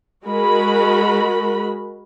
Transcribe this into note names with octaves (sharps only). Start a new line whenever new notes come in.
G#3 F#4 A#4 B5